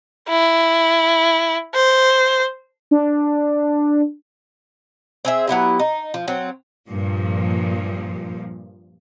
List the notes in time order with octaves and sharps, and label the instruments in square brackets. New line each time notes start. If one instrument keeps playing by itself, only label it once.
[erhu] E4
C5
[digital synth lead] D4
[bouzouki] C4 G#4 E5
F#3 B3 E4 G4
D#4
F3
F#3 C4
[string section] G2 A#2 F3